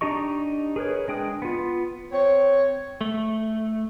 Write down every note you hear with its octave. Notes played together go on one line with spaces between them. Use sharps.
D4 D#4 G4 D#5 C#6
G#4 A#4 B4 C#5
G#3 D4 G5 D#6 F#6
B3 F4
C4 C#5
A3